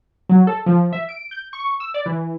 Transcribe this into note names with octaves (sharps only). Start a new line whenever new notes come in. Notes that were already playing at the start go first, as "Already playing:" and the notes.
F#3
A4
F3
E5
D7
G6
C#6
E6
D5
E3